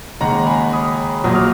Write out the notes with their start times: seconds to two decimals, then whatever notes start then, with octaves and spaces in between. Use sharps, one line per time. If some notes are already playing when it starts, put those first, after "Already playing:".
0.20 D#2 C#3 G#3 F#5 A#5
0.47 G#5 B5
0.73 B5 D#6
1.24 A#1 A#2 F#3 D#6
1.35 F6